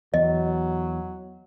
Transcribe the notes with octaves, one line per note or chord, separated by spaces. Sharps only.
E2 F#3 D#5